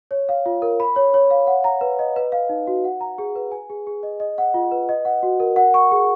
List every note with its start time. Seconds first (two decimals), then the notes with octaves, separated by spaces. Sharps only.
0.11 C#5
0.29 F5
0.46 F4
0.62 A#4
0.80 B5
0.96 C#5
1.14 C#5
1.30 F5
1.47 F#5
1.64 A#5
1.81 B4
1.99 D#5
2.16 B4
2.32 F5
2.49 D#4
2.67 F#4
2.85 F#5
3.01 A#5
3.18 G#4
3.36 B4
3.52 G#5
3.70 G#4
3.87 G#4
4.03 D#5
4.20 D#5
4.38 F#5
4.54 F4
4.71 B4
4.89 D#5
5.05 F#5
5.23 F#4
5.40 A#4
5.56 F#5
5.74 C#6
5.92 G#4